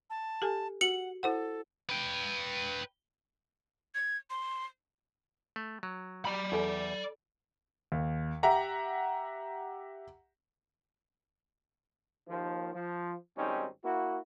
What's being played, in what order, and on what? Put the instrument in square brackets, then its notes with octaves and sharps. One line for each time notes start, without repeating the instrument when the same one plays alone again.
[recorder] A5
[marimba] G4 A4 G#5
[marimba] F#4 [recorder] F#5 [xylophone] C#7 F#7
[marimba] E4 C5 F#5 [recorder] A4
[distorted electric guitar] B4 G5
[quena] G#6
C6
[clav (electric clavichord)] A3
F#3
[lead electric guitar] D5 B5 [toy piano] A#5
[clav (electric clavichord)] E2 [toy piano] D#4 A4 G#5
[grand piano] D#2
G4 E5 F#5 A#5
[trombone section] D#2 F3
F3
G#1 G3 C4 C#4 D#4
A#3 E4 F#4